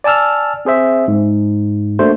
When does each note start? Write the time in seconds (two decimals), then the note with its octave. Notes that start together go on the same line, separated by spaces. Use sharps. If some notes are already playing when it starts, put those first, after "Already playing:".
0.04 D5 G#5 A5 E6 F6
0.65 C4 G#4 C5 E5
1.08 G#2
1.99 A3 A#3 D4 F#4 C5